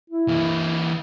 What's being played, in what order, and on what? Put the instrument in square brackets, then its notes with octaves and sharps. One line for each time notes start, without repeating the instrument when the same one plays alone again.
[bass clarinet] E4
[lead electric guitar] E3 A#3